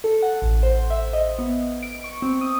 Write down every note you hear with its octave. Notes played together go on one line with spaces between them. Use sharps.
A4
F#5
A1
C5
E5
D#5
B3
D7
C#6
C4
D#6